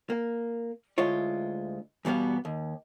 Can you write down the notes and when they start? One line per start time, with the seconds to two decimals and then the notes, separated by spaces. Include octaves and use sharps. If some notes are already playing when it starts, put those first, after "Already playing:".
0.10 A#3
0.98 D2 G#3 E4 F4 C#5
2.05 E2 B2 G3 B3 F5
2.45 D#2